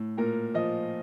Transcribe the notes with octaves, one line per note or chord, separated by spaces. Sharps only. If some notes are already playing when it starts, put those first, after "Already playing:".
Already playing: A2
A#2 A#4
F3 D#5